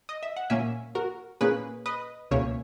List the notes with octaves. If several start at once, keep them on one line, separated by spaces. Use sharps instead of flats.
D#5
E5
F#5
A#2 A#3 C#4 E5 G#5
F#4 A#4
A#2 A#3 C#4 G#4 B4
B4 D#5
C#2 B2 A#3 C#4 C#5 E5